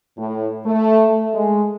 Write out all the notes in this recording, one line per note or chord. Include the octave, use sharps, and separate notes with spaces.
A2
A3
G#3